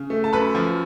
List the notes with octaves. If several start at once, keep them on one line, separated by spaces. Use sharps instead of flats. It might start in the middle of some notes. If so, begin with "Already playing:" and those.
Already playing: C#3
A3
A5
F#2 B4 B5
F3